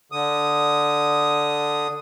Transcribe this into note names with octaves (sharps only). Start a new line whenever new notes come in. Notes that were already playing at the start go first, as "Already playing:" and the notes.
D3 D#6